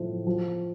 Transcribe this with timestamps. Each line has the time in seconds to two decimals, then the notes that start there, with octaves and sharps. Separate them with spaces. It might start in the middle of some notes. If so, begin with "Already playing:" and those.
Already playing: A2 F3
0.27 F3